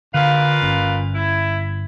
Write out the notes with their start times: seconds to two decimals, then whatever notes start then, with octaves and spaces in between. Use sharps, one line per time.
0.14 A#2 D3 B4 F5
0.62 G1 C#4
1.14 E4